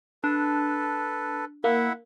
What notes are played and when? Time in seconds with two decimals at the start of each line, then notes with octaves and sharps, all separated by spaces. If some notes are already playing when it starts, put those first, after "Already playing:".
0.24 D4 A4 B4
1.64 A#3 E4 E5 F#5